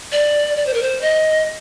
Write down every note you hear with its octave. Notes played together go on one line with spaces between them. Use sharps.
D5
D5
C5
A#4
C5
D#5